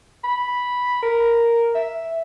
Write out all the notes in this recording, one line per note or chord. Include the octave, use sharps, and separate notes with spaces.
B5
A#4
E5